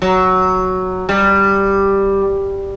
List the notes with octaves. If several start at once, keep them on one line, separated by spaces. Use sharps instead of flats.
F#3
G3